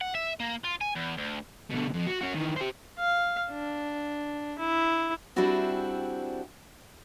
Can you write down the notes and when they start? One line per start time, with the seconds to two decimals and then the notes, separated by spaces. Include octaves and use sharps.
0.01 F#5
0.15 E5
0.40 A#3
0.64 F4
0.81 G#5
0.95 E2
1.17 D2
1.70 B2 D3
1.93 F2
2.06 F#4
2.21 C#4 F#4
2.34 D#3 E3
2.56 G4 C5
2.99 F5
3.51 D4
4.59 E4
5.36 G3 C4 D4 E4 F#4 G#4